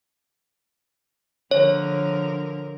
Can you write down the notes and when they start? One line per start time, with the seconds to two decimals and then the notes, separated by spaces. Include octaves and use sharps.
1.51 D3 F3 A#4 C#5